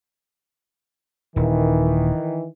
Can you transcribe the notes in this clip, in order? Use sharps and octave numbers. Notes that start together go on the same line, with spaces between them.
D#1 D#3 E3